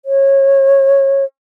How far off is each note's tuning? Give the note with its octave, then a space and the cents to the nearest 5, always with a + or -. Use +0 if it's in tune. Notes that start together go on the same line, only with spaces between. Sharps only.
C#5 -20